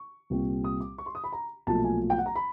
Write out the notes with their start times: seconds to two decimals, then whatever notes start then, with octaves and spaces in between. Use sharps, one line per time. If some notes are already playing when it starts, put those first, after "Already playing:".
Already playing: C#6
0.30 C2 A#2 G3 C4
0.64 D#6
0.81 D6
0.98 C#6
1.06 C6
1.15 D#6
1.24 B5
1.33 A#5
1.67 B1 A#2 F3 A3 A5
1.84 G#5
2.10 G5
2.18 F#5
2.26 A#5
2.36 B5